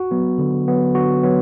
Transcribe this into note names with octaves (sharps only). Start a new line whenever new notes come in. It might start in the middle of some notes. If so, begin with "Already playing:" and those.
Already playing: F#4
F#3 B3
D3
F#3 B3
D3 F#4
F#3 B3